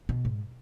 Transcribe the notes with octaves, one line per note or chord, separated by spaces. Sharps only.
B2
G#2